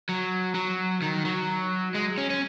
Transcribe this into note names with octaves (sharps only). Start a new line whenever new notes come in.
F#3
F#3
D#3
F#3
G#3
C#4
C#4